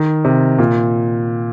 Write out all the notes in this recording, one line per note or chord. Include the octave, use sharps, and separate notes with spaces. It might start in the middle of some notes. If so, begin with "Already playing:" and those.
Already playing: D#3
C3
A#2